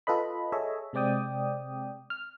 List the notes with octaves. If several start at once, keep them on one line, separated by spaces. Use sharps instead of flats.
F4 A4 B4 D#5 B5
G#4 A4 C#5 D#5 E5
C3 G#3 C4 D5 G5 D#6
F6